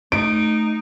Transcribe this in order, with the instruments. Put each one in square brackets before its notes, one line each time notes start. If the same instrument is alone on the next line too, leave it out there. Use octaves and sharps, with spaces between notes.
[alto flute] A3 [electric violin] D#4 [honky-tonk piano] D7